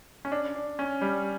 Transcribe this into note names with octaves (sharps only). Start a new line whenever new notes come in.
C#4
D4
D4
C#4
G3